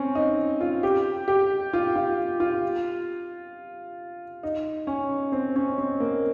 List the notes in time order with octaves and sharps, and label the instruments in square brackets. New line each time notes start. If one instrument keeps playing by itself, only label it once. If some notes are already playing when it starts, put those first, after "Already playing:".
Already playing: [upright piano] C4 C#4
D#4
F4
G4
G4
F4
F4
F4
D#4
C#4
C4
C#4
C4
A#3